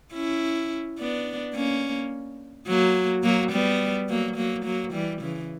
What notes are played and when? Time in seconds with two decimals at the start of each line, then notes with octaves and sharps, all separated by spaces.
0.13 C#4 E4
0.98 B3 D4
1.54 A#3 C#4
2.67 F#3 A#3
3.23 F#3 A#3
3.51 G3 B3
4.09 F#3 A#3
4.36 F#3 A#3
4.65 F#3 A#3
4.93 E3 G3
5.21 C#3 E3